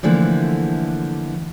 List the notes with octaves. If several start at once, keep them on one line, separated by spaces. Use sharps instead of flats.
D3 E3 F3 A3 A#3